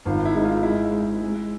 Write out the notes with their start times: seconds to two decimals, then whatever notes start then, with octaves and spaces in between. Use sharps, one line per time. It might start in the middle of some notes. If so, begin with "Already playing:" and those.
0.05 G#1 F4
0.25 E4
0.35 G#2
0.45 F4
0.63 G#3 E4
0.92 G#3
1.21 G#3